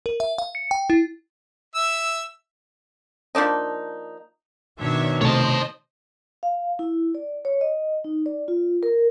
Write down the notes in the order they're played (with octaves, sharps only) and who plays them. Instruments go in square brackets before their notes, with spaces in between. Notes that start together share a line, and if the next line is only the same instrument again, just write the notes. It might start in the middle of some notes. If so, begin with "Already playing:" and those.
[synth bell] A#4
E5
F5
C#7
G5
E4
[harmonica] E5 E6
[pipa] F3 A#3 D4 D#4
[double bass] B2 D#3 [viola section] D4 C#5 E5
[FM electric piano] C3 A3 [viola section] C5 D#5 [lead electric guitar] C#5 A5
[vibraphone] F5
E4
D5
C#5
D#5
D#4
D5
F4
A#4